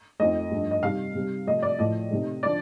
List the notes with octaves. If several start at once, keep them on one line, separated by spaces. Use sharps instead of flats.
F2 D#3 A3 D#5
G2 F3 A3
D#5
C3 D#3 G3 F5
C3 G3
C3 F3 A3 D#5
D5
A2 F3 A3 D#5
C3 D#3 A3
D3 F3 D5